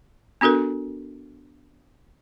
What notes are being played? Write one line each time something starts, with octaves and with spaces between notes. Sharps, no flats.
B3 D4 F#4 A4 A#4